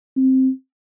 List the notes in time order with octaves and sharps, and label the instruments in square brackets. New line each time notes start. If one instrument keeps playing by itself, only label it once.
[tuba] C4